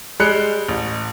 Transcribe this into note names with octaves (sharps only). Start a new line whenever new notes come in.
G3 G#3 F#6 C#7
A1